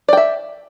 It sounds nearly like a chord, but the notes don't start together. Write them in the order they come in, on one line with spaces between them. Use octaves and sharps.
D5 G5 E5